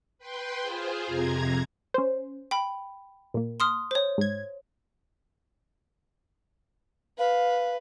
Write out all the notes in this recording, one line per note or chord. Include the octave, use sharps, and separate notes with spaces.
B4 G5 C6
F4 G#4 C5
F2 C3 A#5 G#6
C#4 C5
G5 B5
A#2 A#3
C6 D#6 F6
C5 C#5
G#2 G#6
B4 F5